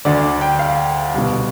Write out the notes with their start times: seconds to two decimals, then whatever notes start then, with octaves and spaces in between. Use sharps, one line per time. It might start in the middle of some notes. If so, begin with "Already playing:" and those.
0.05 D2 D3 D5
0.41 G5
0.59 F5
1.14 C2 B2